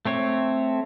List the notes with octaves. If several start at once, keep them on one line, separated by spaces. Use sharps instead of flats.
A3 C4 C#5